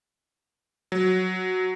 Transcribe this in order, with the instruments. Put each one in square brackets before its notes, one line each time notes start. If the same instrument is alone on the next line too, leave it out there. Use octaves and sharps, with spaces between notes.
[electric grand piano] F#3